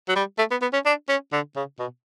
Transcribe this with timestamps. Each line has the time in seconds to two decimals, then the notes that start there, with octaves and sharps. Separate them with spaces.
0.09 F#3
0.16 G3
0.38 A3
0.51 B3
0.62 B3
0.73 C#4
0.86 D4
1.09 C#4
1.33 D3
1.56 C#3
1.79 B2